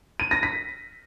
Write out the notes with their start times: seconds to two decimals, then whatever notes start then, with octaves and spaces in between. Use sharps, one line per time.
0.20 D#7
0.31 A#6
0.43 B6